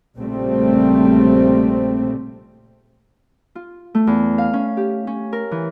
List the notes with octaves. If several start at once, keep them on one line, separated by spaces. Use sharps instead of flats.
A#1 A#2 C#3 G3 A3 C4
F4
A3
E2
F5
C#4
G4
C#4
A#4
E3